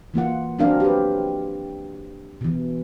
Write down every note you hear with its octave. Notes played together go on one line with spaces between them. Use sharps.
E3 A#3 F4 F#5
F3 F#3 C4 D4 A#4 F5
G4 B4
B2 E3